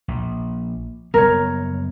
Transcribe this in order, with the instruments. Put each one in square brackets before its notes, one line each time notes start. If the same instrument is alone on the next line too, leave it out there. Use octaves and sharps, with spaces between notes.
[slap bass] A#1
[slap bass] F#1 G3 B3 [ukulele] A#4 C#5